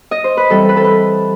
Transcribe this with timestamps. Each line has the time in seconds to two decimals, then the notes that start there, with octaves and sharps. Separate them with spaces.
0.11 D#5
0.24 C5
0.37 B4
0.50 E3 G3 C4 A4
0.69 B4
0.77 A4
0.84 B4